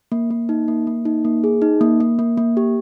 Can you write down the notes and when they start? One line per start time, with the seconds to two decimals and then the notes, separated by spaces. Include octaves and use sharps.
0.12 A#3
0.31 A#3
0.49 D#4
0.68 A#3
0.87 A#3
1.05 D#4
1.25 A#3
1.44 G#4
1.62 D#4
1.81 A#3
2.00 A#3
2.19 A#3
2.37 A#3
2.57 G4